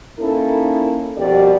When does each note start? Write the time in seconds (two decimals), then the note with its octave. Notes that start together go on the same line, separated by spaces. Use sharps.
0.20 A#3 C#4 D#4 E4 A4
1.17 F2 B2 G3 G4 A#4 D5